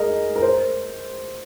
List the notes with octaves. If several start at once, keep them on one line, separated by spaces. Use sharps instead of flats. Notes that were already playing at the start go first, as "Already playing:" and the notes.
Already playing: G#4 A#4 D#5
A#4
C5